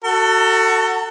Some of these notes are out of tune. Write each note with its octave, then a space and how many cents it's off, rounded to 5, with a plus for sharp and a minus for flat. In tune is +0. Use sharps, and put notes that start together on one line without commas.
F#4 +10 A4 +25 A#5 -45